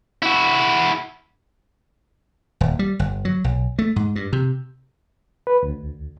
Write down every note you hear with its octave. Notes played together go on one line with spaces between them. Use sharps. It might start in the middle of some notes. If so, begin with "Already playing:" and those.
E4 F#4
D#1
G3
G1
F#3
B1
A3
G#2
G2
C3
B4
D2